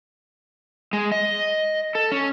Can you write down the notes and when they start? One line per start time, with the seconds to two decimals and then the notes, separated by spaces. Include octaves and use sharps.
0.93 G#3
1.12 D#5
1.95 A4
2.11 C#4